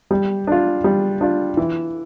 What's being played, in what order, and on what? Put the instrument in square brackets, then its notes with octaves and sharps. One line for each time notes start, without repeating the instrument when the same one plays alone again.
[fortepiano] G3
D4 F4
G3
D4 F4
E3